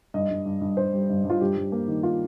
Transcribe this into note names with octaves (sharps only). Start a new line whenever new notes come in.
G2 D#5
G2
G2
G2
G2 C5
G3
G2
G2
F4
G2 G4
G2
A#3
D#3
F4